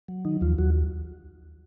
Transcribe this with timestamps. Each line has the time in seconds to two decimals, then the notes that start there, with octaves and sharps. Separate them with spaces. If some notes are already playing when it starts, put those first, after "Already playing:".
0.08 F#3
0.25 D#3 D#4
0.41 D#2 F3 F4
0.58 D#2 F#3 F#4